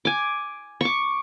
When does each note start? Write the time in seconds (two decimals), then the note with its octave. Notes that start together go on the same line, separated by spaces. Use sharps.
0.05 G#5 D6
0.81 C#6 D6